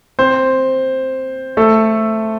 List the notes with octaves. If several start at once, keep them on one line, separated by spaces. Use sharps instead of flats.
C4 C5
A3 A4